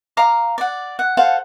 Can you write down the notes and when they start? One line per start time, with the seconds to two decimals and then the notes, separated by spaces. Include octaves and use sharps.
0.17 F5 A#5 D6
0.58 D5 F#5
0.99 F#5
1.17 A4 C5 F5 F#5